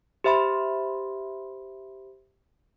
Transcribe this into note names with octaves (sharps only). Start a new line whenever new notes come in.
G4 C5 E5 B5 C6